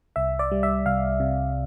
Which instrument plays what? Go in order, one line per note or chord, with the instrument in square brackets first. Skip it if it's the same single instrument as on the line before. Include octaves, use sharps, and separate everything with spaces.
[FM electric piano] C2 E5
D5
G3
E5
C2 F5
C3